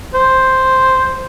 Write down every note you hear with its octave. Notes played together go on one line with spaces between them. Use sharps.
C5